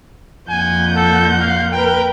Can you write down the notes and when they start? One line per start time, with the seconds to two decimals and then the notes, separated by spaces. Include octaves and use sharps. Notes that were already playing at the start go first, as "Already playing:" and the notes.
0.49 F2 A#2 F#5 G#5 G6
0.96 A4
1.39 F5
1.72 A#4 B4 G5